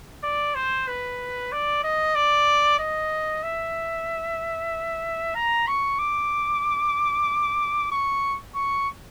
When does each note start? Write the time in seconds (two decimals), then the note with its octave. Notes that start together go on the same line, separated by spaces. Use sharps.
0.23 D5
0.55 C5
0.87 B4
1.52 D5
1.83 D#5
2.15 D5
2.79 D#5
3.43 E5
5.35 A#5
5.68 C#6
5.99 D6
7.92 C#6
8.55 C#6